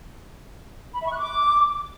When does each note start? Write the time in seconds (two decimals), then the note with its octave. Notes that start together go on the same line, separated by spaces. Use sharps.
0.94 B5
1.00 E5
1.06 C#6
1.12 F#6
1.17 D6